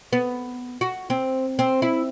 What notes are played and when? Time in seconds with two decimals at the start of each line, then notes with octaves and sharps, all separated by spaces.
0.13 B3
0.81 F#4
1.10 C4
1.59 C4
1.82 E4